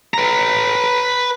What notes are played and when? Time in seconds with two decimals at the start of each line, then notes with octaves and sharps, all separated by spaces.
0.14 B4 A#5